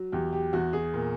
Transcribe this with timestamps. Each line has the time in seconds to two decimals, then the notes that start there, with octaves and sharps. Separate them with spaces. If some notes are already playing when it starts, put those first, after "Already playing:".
Already playing: F#3
0.12 E2 G4
0.33 G4
0.53 E2 F#4
0.73 G#4
0.94 A#2